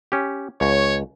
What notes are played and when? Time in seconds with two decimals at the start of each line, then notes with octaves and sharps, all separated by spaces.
0.12 C#4 G4
0.61 C#2 C#5